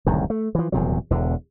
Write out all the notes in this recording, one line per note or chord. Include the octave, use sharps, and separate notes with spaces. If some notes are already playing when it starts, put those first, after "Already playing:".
D1 C2 F#2 D#3
A3
E3 F3
D#1 E2 C3 F#3
E1 E2 D3